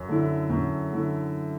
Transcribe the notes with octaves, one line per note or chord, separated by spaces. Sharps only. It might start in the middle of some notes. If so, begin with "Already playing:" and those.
Already playing: F#2
D3 A3 E4
F#2
D3 A3 E4